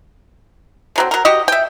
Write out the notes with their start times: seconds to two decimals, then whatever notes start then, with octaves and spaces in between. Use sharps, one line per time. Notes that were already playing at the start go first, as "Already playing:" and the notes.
0.96 D3 F#3 C4
1.11 F#3 A#4
1.25 F#4 G4 D#5
1.48 E5 G5